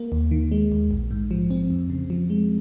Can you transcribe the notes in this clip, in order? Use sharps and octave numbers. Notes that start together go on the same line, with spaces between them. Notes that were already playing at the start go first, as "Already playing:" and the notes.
Already playing: A#3
D#2
D#3
G#3
D#2
A#1
G#2
F3
C4
F2
C#3
F3
G#3